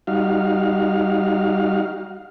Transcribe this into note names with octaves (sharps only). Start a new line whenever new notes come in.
G3 D#4 F#4 F5